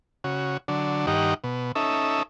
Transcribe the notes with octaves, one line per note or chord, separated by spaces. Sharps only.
C#3 F#4
D3 F#3 D4
G2 D#3 D#4 G4 F#5
B2
C#4 D#4 A4 E5